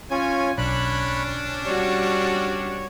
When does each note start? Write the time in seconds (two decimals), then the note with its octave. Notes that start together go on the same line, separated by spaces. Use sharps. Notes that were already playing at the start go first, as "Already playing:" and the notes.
0.11 C#4 F4 C#5 G#5
0.58 B1 C#4 D4 C#5 B5 F#6
1.66 G3 F#4 C#5